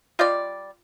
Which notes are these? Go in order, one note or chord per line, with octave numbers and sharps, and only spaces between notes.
G3 F4 D5 D#5 G6